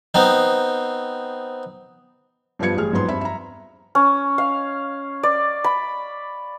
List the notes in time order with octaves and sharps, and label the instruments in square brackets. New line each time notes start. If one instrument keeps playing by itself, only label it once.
[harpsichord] B3 C4 D#4
[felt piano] G2 F3 G3 B3 G#6 C#7
A1 G#4 F6
F2 G#2 F#3 B3 C6
G2 C4 E5 B5
E5 A#5
[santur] C#4
F5
D5
B5